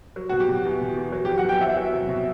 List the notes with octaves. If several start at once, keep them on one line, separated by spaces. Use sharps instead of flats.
F#3
B2 F#4
G4
B2
E2
B2
E2
F#3
F#3 G4
F#5
E2 G5
E2 E5
F#3
C3
B2